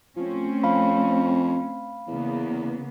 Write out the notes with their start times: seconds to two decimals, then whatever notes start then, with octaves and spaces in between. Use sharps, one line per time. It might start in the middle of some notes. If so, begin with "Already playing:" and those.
0.16 F3 A3 C4 C#4
0.64 F2 F5 B5
2.08 E2 C#3 A#3 B3